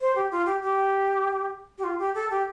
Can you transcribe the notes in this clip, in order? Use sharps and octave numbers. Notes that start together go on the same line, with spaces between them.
C5
G4
F4
G4
G4
G4
F4
G4
A4
G4